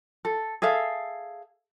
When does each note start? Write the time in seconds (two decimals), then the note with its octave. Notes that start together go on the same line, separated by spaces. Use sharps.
0.25 A4
0.62 G#4 A4 E5 F5